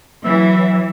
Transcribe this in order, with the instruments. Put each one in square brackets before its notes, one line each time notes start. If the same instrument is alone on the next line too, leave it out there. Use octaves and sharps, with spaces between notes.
[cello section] E3 [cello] F#3 [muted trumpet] E5